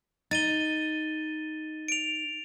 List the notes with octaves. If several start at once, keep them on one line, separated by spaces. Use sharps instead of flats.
D#4 A6 D#7 G7
D7 F7